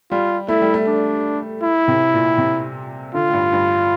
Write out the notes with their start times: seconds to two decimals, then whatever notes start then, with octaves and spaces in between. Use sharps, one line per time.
0.11 G3 F4
0.48 A3 E4
0.62 G3
0.74 A3
0.87 D4
1.63 E4
1.88 C3
2.14 A#2
2.38 C3
3.14 D3 F4
3.28 A2
3.33 G2
3.53 G2